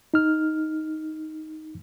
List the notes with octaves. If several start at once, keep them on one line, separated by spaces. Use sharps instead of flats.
D#4 F6